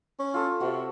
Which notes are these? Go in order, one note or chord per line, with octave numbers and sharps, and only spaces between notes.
C#4
F4 A4
C3 F#4